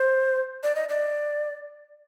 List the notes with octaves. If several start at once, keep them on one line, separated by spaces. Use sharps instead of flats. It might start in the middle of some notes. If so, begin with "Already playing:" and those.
Already playing: C5
D5
D#5
D5